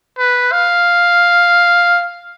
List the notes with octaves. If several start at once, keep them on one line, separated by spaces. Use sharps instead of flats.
B4
F5